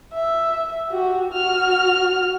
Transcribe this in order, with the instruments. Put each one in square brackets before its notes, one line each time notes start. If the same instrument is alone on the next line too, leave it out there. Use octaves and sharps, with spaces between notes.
[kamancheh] E5
F#4 G4
F#4 F6